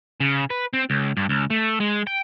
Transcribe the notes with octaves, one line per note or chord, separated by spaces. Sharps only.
C#3
B4
C4
C#2
G2
C#2
A3
G#3
G5